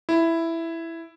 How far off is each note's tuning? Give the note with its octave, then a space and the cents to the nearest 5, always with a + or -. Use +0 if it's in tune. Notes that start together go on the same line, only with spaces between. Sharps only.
E4 +5